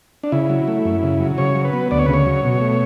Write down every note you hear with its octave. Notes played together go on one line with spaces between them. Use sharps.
D4
C#3 E4
F#3
A3
F#2
C#3
F#3
C#3 C#5
F#3
B4
B3
D2 D5
C#5
C#3 B4
C#5
F#3
B2
A3